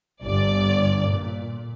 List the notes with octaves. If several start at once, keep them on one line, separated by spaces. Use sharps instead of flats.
G1 D5
A#2